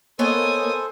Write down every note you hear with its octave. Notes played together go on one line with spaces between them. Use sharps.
A#3 B3 A4 C5 C#5 D#5 G#5 D#6